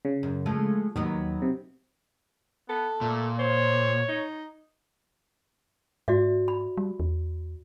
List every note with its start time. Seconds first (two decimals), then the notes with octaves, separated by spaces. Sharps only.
0.05 C#3
0.23 F#2
0.46 F3 G#3 A3
0.96 D#2 D#3 F#3 B3
1.42 C3
2.69 B3 A4
3.01 A#2 A3
3.39 C5 C#5
4.08 D#4
6.08 G#2 F#4 D5 E5
6.48 B5
6.77 G3
7.00 E2